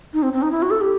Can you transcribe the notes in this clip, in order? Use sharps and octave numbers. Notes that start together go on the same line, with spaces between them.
D#4
C4
C4
D#4
E4
F#4
A4
G4